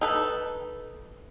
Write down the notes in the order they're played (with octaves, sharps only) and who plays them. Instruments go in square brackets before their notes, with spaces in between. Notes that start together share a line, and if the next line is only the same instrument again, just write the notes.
[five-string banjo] D#4 A4 B4